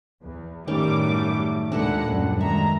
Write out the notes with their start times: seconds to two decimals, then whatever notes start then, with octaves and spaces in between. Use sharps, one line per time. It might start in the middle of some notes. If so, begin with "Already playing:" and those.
0.23 E2
0.68 F#2 A2 D#3 F#3 G3 A3 C#4 D6
1.72 D#2 A#2 G#3 D4 A4 B4 F#5
2.07 F#2 G3
2.41 D#3 G#3 E5 A#5